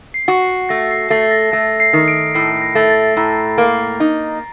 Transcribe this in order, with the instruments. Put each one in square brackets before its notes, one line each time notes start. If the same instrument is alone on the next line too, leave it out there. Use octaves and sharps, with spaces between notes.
[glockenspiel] C7
[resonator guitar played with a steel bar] F#4
[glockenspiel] C7
[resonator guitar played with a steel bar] A3 [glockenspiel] A#6
[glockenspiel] C7
[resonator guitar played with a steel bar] A3 [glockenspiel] C7
[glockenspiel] A#6
[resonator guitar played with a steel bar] A3 [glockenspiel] A#6
[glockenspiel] C7
[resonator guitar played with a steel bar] D#3
[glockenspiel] D7
[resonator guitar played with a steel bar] A2 [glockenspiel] C7
[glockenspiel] A#6
[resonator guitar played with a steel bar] A3
[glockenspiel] A6
[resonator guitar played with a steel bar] A2 [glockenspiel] A#5
[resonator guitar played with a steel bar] A#3
D#4